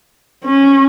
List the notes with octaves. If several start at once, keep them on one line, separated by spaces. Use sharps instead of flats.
C#4